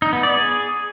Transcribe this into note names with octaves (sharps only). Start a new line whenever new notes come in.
D#4
B3
D5
G#4